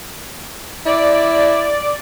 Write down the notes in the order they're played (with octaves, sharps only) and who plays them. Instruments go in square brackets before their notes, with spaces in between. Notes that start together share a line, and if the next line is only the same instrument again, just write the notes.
[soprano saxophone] E4 [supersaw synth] D5